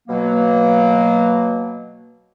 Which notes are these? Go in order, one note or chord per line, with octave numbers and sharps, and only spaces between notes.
B2 F#3 A#3